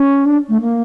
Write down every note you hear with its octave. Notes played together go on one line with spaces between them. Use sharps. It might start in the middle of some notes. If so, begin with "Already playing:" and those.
Already playing: C#4
D4
A3
A#3